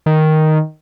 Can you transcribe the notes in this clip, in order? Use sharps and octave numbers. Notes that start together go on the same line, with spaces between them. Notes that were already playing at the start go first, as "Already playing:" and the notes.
D#3